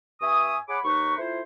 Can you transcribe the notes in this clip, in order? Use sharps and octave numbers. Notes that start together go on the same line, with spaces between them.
G2 E5 G#5 C#6 D#6
G#4 C#5 F#5 B5 D6
D#2 D#4 B4 C#6
A3 E4 F4 C5